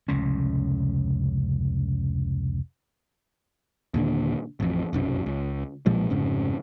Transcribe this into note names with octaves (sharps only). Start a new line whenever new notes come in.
F1 C#2 A2 C#4
D#2 A#2 D3
A1 F2
F1 B1 F#2
C#2
B1 A#2 F3 G#3
F1 F2 G#2 C#3